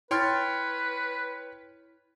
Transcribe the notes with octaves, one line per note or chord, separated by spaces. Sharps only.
E4 B4 C#5 G5 C6 F6 A6